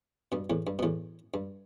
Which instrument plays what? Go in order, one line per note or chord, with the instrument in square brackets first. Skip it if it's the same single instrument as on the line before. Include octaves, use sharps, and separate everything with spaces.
[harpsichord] G2 B2
E2 A2
G2
B2
E2 A2
G2